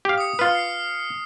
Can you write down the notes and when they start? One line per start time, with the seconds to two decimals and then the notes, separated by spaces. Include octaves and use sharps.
0.05 G4 F5
0.18 D#6 C#7
0.39 F4 B4 F6
0.55 C7